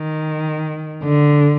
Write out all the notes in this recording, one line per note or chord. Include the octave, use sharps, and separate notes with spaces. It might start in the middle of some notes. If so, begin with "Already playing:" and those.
Already playing: D#3
D3